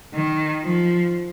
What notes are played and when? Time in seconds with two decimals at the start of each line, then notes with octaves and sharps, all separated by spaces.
0.14 D#3
0.64 F3